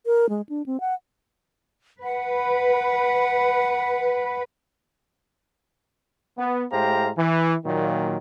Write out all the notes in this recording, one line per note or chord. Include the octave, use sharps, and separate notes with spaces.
A#4
G#3
D4
C4
F#5
B4 F#5
B3
A2 G#3 G4 C5 F5 A#5
E3
A#2 D#3 F#3